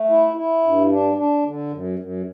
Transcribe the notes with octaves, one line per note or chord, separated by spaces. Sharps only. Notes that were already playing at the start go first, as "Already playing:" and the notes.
Already playing: A3
E4
E4
G2
D4
D4
D3
F#2
F#2